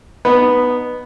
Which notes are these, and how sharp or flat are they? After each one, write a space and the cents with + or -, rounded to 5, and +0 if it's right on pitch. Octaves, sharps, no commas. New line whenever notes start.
B3 +0 D#4 -25